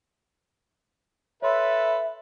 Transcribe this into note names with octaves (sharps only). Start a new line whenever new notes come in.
A4 B4 C#5 E5 C6